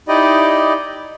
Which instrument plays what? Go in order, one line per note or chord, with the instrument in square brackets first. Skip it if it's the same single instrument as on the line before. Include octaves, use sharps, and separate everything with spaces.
[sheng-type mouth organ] D#4 E4 G4 D5 D#5